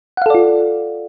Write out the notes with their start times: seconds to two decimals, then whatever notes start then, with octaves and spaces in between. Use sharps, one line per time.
0.17 F#5
0.22 F5
0.26 A4
0.30 D5
0.35 F4